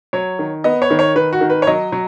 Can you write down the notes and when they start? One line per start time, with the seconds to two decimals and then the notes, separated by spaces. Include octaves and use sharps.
0.13 F#3 C#5
0.39 D#3
0.64 B3 D#5
0.82 C#5
0.90 D#3
0.99 C#5
1.16 D#3 B4
1.33 F#4
1.41 D#3
1.50 B4
1.62 C#5
1.67 F#3 D#5
1.92 F#3